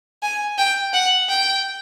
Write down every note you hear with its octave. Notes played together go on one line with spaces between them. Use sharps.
G#5
G5
F#5
G5